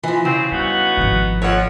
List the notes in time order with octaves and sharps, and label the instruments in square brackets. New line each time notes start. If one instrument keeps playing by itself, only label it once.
[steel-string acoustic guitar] E3 F3
[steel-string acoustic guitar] C#3 [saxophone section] C4
[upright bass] G3 [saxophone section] B3 D#4 F#4
[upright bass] G#1 F3
[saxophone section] F2 [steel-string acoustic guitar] C#5 F#5